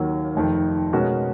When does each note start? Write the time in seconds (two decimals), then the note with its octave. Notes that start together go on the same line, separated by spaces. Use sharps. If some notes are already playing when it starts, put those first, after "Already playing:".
Already playing: D#2 D#3 F#3 A#3
0.34 F1 F2 D#3
0.93 B2 G#3 C#4 F#4 A#4